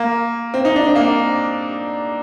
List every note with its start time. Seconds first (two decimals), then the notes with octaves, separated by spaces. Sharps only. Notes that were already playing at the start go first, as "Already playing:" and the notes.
Already playing: A#3
0.54 C4
0.65 D#4
0.76 D4
0.87 C4
0.96 A#3